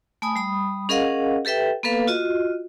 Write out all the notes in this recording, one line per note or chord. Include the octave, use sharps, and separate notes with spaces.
A3 G#5 B5 D#6
G3 B5 D#6
C#4 G#4 A#4 D#5 F5 F#5
G4 A4 B4 E5 G5
A#3 B3 A4 B4 F5
F4 F#4 D#5